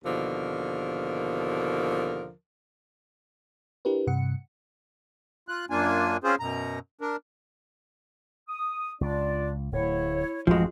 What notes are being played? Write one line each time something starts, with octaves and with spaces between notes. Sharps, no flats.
D#2 B2 D3 F3 A#4
D4 E4 G4 A#4 B4
G2 C3 F#5 C#7
F4 F#6
F#2 A#3 D4 F4 G#5
C4 C#4 F4 G#4 C5
F#2 B2 A#5
D4 A#4
D#6
C#2 D4 F4 D5
D1 A2 E4 C#5
A1 F#2 F3 G#3 F#4